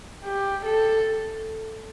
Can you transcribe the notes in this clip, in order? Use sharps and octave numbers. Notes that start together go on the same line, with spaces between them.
G4
A4